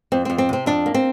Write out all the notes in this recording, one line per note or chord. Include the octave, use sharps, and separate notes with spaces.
F2 C4
C4
F2
C4
C3 C4
F2 D4
A#3
C4